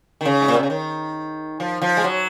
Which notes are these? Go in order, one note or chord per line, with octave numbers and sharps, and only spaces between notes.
D#3
C#3
G#2
A#2
C3
C#3
D#3
F3
F3
G#3
F#3